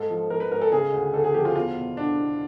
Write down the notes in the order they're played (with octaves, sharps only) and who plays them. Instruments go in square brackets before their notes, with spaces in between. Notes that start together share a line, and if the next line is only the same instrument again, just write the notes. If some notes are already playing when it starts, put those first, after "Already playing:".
Already playing: [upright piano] G#2 A4
F3
F3 A#4
B4
G#2 A#4
A4
C#3 G#4
D2
D2 A4
G#4
F3 G4
F4
E2 F4
B2
B2 D4
E2